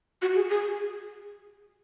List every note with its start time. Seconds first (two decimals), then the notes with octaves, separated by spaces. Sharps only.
0.22 F#4
0.35 G#4
0.49 G#4